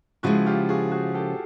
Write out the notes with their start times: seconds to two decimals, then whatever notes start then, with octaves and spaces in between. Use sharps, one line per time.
0.23 C#3 F3 G#3 E4 F#4
0.46 F4 G4
0.69 F#4 G#4
0.92 F#4 G#4
1.14 G4 A4